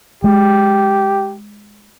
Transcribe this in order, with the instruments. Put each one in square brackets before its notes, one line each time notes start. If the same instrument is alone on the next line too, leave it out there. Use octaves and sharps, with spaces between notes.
[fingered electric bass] G#3 [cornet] G4